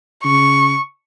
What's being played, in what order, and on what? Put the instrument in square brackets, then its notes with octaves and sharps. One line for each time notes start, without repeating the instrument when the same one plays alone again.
[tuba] C#3 [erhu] C#6